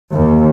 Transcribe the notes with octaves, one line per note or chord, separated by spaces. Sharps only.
D#2